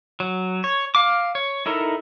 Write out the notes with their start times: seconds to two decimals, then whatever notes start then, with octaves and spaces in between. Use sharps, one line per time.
0.20 F#3
0.64 C#5
0.95 F5 D6
1.35 C#5
1.66 D#4 E4 A4 A#4